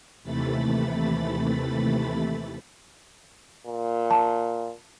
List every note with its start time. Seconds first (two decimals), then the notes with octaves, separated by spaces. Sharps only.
0.23 D#2 C3 E3 A3 B5 A6
3.67 A#2
4.11 A5